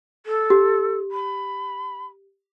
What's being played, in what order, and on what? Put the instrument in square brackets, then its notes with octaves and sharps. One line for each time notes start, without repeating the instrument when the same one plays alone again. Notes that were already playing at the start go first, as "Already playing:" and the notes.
[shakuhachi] A4
[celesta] G4
[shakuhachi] B5